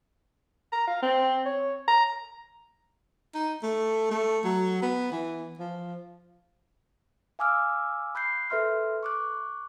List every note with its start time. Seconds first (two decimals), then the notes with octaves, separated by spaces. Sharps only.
0.73 A#5
0.87 F5
1.02 C4
1.46 C#5
1.88 A#5
3.35 D#4
3.63 A3
4.11 A3
4.45 F#3
4.82 B3
5.12 E3
5.59 F3
7.39 F5 G#5 D6 E6 F6
8.15 B5 F#6 G6 C7
8.50 A4 B4 E5 C6 F6
9.03 C#6 D6 F#6